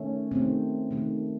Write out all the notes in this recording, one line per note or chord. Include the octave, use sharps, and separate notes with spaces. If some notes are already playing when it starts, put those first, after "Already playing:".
Already playing: D#3 A3 C#4
C3 D#3 A3 C4
C3 D#3 A3